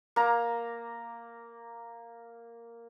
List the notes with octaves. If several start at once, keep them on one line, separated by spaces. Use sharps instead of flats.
A#3 A#5